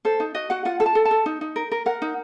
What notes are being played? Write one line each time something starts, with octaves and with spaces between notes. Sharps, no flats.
A4 C5
D#4
F#4 D#5
F#4 F#5
F4 F#5
A4
A5
A4
A5
A4
D#4
D#4
A#4
A#4
A#4 F#5
D#4